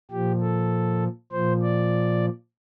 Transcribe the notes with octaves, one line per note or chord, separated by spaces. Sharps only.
A#2 F3 G4
A4
A#2 F3 C5
D5